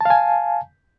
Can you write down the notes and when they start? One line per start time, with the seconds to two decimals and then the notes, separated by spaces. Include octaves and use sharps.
0.01 A5
0.05 F5
0.10 G#5